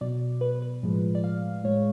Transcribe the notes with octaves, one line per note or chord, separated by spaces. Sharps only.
B2 F#3 D5
B4
B4
A2 F3 G#3
D5
F5
A2 G#3 C#5